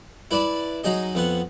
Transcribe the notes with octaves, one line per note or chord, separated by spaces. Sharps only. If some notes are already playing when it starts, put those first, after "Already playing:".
E4 B4 D5 A5 B5
F#3 D#4 G#4 D#5
F2 B3 F#5